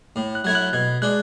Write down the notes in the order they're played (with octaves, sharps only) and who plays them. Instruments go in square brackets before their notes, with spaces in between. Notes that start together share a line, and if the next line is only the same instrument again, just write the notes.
[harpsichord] A2
[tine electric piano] F#6
[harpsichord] F#3 A3 E4 [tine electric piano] G#6
[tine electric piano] F#6
[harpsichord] B2 [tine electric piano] G#6
[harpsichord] G#3 D4 [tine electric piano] F#6